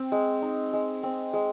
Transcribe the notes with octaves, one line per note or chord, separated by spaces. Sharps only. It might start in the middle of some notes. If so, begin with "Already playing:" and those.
Already playing: C4
G#3
D#4
G#3
C4
G#3